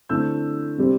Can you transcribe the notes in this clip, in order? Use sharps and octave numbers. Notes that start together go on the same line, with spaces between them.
D3 A3 C4 E4 E6 G6
C3 G3 C4